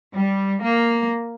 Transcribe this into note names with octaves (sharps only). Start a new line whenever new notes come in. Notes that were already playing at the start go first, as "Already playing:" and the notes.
G3
A#3